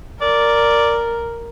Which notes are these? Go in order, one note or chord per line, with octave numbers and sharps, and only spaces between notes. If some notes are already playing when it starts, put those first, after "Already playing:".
A#4 D5